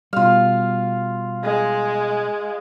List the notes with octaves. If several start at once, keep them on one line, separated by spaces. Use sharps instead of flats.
B2 G3 F4 F5
G#3